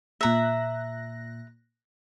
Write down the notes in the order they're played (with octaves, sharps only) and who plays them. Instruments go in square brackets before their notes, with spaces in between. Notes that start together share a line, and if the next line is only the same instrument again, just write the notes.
[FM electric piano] A#2 F#6 A#6 [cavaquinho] E5 A#5